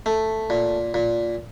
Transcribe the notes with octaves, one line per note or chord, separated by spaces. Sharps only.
A3
A#2
A#2